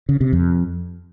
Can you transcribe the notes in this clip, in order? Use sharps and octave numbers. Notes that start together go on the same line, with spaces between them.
C#3
C3
F2